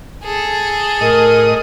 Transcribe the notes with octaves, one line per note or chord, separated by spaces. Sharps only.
G#4 A4
A2 A#4 D#5 D#6